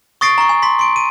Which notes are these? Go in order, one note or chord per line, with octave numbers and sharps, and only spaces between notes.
C#6 D#6 A6 A#6 C7 D7
A#5 C#6
G#5
C6 B6
C6 D7
D#7